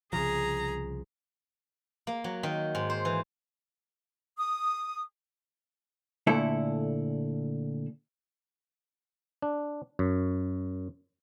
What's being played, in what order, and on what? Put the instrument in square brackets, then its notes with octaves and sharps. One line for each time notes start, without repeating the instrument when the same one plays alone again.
[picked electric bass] C2 C#3 F3 [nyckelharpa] G#4 [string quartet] A#5
[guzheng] A#3
F#3
D#3
G#2
C5
E3
[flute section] D#6
[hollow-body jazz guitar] A#2 D3 A3 E4 A4
[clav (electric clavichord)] D4
F#2